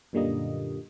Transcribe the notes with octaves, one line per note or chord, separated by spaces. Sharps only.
F#2 A#2 D3 G3 A#3 D#5